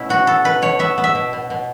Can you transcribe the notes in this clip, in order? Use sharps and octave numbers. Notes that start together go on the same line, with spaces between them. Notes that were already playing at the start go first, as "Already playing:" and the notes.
Already playing: B2 A3 C#4 E4
B3 F#4
B3 A4
B2 B4
B2 C#5
B3 E5
B3
E5
B2
B2
B2